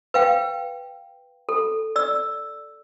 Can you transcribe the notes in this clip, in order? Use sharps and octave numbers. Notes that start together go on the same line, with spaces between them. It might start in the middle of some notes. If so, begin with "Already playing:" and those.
B4 F5 G5
A4
D5 E6